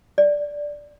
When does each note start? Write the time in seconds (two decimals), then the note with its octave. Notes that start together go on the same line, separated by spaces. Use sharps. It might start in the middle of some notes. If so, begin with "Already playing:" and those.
0.18 D5